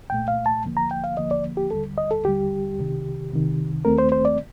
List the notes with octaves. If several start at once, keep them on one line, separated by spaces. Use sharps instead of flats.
C2 A#2 A3 G5
F5
A5
D#2 D3 F3 A#3
A#5
G5
F5
D#2 D3 F3 A#3 D#5
D5
G4
D#2 D3 G3 A4
D#5
A4
D#2 D3 G3 G4
C2 C3 D#3
C2 C3 D#3
D#2 D#3 A3 C4 A#4
C5
C5
D5